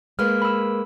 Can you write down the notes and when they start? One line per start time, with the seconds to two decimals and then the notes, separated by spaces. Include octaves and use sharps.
0.19 G#3 A#3 B4 F6
0.42 B5 E6